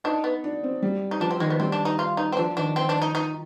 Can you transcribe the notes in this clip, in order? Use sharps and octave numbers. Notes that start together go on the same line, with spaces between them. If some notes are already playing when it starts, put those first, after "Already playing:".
D4 D#4
B3
D4
C4
G3
D#4
F3 D4
C4
D#3 G#3
B3
G3 C4
D4
D#4
F4
D#4
C4
F3 D4
D#3 D4
C4
D4
D#4
D#4